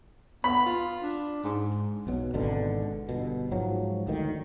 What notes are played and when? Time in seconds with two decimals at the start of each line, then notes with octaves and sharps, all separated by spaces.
0.44 B3 B5
0.66 F4
1.02 D4
1.44 G#2
2.07 B1 B2 F#3
2.34 G#1 B2 D3
3.09 G1 B2
3.51 G#2 F3 F#3
4.07 D2 D#3